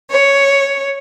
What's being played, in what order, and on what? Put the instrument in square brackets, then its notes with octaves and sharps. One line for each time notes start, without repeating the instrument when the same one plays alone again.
[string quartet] C#5